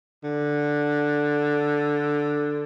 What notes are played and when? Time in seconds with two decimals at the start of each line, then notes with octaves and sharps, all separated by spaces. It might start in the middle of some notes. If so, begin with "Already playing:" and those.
0.24 D3